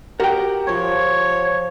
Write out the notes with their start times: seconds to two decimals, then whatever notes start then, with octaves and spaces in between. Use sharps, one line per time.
0.20 F#4 G4 A#4 F#5 G5
0.67 F3 C5 C#5